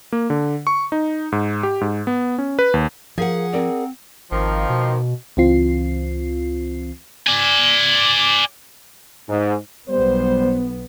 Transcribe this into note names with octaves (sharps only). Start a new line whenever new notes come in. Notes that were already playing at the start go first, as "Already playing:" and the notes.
A#3
D3
C#6
D#4
G#2
G4
G#2
B3
C#4
B4
D#2
F3 G#4 A#4 F5 F#5
C4 A#4 D5
G#1 D#3 F3 A#3
B2
C#2 E3 C4 F4 C7
D5 G#5
G#2
B1 G3 B3 C5